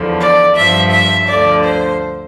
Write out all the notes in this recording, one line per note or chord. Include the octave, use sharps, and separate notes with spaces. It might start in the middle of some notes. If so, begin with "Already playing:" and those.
Already playing: E2 D3 F3
D5
G2 F3 E5
E5
D2 D3 F3 D5
C5